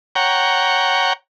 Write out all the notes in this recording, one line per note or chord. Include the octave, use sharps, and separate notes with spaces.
C#5 F#5 G5 A#5